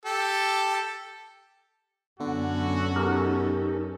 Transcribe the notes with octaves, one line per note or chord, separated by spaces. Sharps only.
G4 A4
F#2 D3 B3 C#4 F#4 A4
B2 D#4 G4 A#4